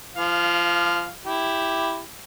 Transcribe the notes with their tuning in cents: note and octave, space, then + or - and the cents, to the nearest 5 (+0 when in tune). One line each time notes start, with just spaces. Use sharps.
F3 -25 F5 +0
E4 +0 G4 +0